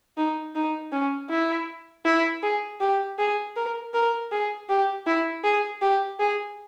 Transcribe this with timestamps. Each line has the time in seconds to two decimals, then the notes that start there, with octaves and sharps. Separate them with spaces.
0.17 D#4
0.55 D#4
0.92 C#4
1.30 E4
2.05 E4
2.43 G#4
2.81 G4
3.19 G#4
3.56 A#4
3.94 A#4
4.31 G#4
4.69 G4
5.07 E4
5.44 G#4
5.82 G4
6.19 G#4